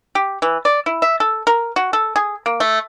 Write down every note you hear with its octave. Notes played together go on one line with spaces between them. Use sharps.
G4
E3
D5
E4
E5
A4
A#4
F#4
A4
G#4
A#3
A3